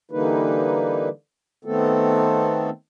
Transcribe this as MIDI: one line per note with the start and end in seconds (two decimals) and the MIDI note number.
0.11 1.09 50
0.11 1.09 52
0.11 1.09 55
0.11 1.09 58
0.11 1.09 63
0.11 1.09 71
1.65 2.70 51
1.65 2.70 57
1.65 2.70 59
1.65 2.70 60
1.65 2.70 69